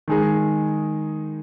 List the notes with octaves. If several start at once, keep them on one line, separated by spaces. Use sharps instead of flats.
D#3 G#3 D#4 G#4